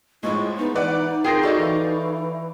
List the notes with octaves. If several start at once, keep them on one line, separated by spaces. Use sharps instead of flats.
A2 F3 G#3 E4 C#6
B3 D#4
E3 B4 D5 F#5
C4 F4 G#4 A#4 G5 G6 A#6
F#4 A4 D5 D#5 F5 C#6
E3